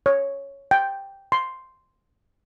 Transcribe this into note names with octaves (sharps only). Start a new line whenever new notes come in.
C#5
G5
C6